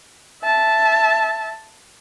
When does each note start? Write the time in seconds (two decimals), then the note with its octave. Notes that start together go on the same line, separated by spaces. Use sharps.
0.43 E5 A5